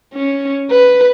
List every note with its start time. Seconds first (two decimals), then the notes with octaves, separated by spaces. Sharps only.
0.15 C#4
0.71 B4